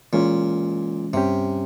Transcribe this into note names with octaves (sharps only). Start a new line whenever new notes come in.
A#2 E3 G#3 C#4
G2 C3 G3 C#4 G4